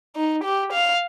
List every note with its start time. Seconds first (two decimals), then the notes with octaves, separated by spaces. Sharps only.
0.16 D#4
0.44 G4
0.72 F5